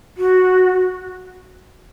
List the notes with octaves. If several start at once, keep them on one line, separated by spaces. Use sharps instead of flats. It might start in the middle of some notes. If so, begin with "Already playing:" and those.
F#4